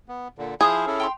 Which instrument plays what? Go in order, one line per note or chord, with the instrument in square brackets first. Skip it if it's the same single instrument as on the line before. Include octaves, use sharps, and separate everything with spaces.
[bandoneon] B3
A#2 D3
[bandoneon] F3 E4 C5 [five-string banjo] G#4 [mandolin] F5 D#6 F6
[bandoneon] C#4 E4 A4
[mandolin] G5 A#5 C6